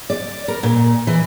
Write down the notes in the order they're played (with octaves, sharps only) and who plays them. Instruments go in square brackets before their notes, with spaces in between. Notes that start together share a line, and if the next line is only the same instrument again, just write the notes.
[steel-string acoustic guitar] D5
A#4
A#2
E3